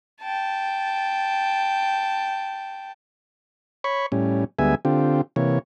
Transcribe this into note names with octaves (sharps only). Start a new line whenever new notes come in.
G5 A5
C#5 B5 C#6
A2 G3 C#4
D2 G3 G#3 B3 E5 G#5
D3 C4 F4 G4
C3 E3 A#3 C#5